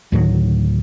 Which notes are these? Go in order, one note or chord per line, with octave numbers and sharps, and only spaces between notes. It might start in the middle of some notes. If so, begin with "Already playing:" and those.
D2 A2 D#3 F#3